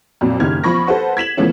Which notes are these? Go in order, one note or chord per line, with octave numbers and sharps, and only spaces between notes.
F2 A#2 F#3
F#1 D#3 G4 F6 G#6
E2 F3 B5 C#6 A#6
A4 B4 C5 F#5
G#6 B6 E7 F#7
C#3 E3 F3 A3 B3 C#4